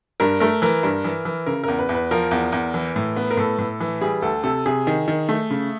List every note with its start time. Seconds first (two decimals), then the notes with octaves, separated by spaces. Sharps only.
0.20 G2 A#4
0.40 A3 A#4
0.62 E3 A#4
0.83 G2
1.05 E3
1.25 E3
1.46 C#3 A#4
1.64 E2 A#4
1.79 B4
1.89 E2
1.95 B4
2.11 F3 A#4
2.31 E2
2.52 E2
2.74 E3
2.96 A2
3.17 B3
3.31 A#4
3.37 A2 A4
3.59 A2
3.80 E3
4.01 G3 G#4
4.22 D2 A4
4.44 C3 A4
4.66 C3 G#4
4.87 D#3
5.08 D#3
5.29 A3
5.50 C#3